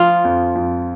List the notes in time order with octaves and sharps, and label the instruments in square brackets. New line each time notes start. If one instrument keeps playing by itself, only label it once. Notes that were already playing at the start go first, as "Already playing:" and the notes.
Already playing: [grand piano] F3 [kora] F4
[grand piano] F2
F2